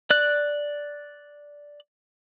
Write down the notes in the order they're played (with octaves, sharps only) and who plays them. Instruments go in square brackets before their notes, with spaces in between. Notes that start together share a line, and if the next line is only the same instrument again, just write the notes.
[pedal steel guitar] D5 F#6